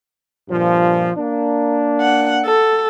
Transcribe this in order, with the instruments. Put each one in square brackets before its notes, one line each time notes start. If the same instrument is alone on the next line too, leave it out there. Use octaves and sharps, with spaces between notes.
[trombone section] G2 A#2 F3
A#3 D4
[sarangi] F#5
A4